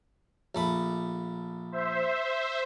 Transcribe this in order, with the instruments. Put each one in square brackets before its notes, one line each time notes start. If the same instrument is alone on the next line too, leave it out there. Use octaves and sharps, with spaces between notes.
[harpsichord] A#1 A3 B5
[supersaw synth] C5 E5